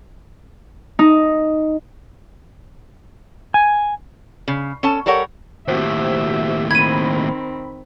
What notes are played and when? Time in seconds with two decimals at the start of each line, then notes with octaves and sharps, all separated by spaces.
0.99 D#4
3.54 G#5
4.48 C#3
4.83 C#4 A4 A5
5.06 G3 A4 A#4 C#5 F#5
5.68 D#2 A2 C4 F#4 G4 E5
6.71 D#3 C4 B5 G#6 D#7